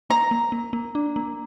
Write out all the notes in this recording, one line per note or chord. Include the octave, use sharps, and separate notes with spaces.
A#3 A#5
A#3
A#3
A#3
D4
A#3